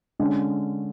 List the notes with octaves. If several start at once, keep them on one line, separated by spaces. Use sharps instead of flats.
D3 G#3 C#4